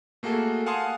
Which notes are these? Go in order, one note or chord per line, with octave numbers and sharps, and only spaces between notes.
A3 A#3 F#4 G#4 A4
F5 F#5 G#5 A5 C6 D#6